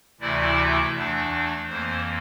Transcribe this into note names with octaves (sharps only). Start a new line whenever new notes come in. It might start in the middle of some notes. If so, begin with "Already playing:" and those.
D2 C3 E3 A3 E4 D5
E5
E2 E3 A3 D4 E5
F2 E3 A#3 C5